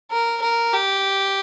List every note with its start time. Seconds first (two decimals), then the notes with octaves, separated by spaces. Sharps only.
0.11 A#4
0.42 A#4
0.74 G4